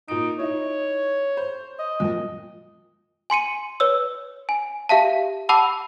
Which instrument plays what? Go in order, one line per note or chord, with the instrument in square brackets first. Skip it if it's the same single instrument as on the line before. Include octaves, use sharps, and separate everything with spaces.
[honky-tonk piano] A#2 D7 [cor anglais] D#4
[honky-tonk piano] D#4 E4 [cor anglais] C#5
[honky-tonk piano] C5
[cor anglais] D#5
[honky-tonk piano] F2 A#2
[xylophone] G#5 C6 C#7 D#7
B4 C#5 E6
G#5
G4 E5 F5 A5
F#5 A5 B5 D6 E6